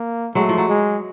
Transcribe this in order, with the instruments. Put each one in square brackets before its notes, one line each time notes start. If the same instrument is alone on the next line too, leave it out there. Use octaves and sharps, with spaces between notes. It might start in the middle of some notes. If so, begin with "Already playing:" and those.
Already playing: [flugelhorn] A#3
[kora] F#3 G#3 [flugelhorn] A3
[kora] F3
F#3
[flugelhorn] G#3